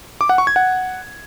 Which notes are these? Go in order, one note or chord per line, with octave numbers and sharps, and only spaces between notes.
D6
F#5
C#6
G#6
F#5